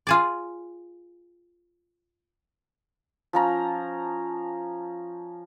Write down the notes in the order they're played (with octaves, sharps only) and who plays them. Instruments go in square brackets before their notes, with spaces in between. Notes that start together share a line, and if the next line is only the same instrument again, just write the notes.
[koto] F4 G#4 D5
[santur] F3 C#4 A#5